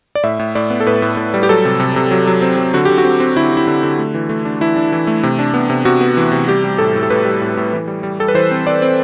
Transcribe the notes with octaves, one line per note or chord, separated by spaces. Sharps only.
D5
A2 E5
A2
A2 D5
B3
A4
A2 B4
A2
A2
G3
G4
F#3 A4
C3
C3
C3
F#3
F#3
C4
F#3
D3 F#4
D3 G4
F#4
C4
C4
D3 E4
C4
E4
D3
D3
A3
E3
A3
D4
E3 E4
D4
E3
A3
C3
D4
B3
C3
C3 F#4
B3
E3
C3
G3 G4
G3
A2 A4
A2
A4
A2 B4
G3
A2
A2
E3
G3
G3
G3 A4
B4
E3 C5
C4
C4 D5
C4